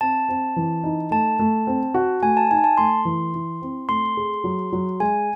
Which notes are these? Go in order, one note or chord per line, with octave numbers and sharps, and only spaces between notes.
C4 A5
C4
E3
D#4
A3 A5
A3
C4
F#4
A3 G#5
A5
D#4 G#5
A5
A3 C6
E3
E4
C4
A3 C6
G#4
F#3
F#3
G#3 G#5